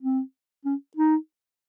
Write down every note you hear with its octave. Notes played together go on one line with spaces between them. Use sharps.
C4
C#4
D#4